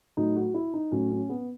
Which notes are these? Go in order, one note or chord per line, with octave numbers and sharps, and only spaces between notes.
A2 F#3 D#4
F#4
E4
D#4
A2 F#3 C#4
C#4
B3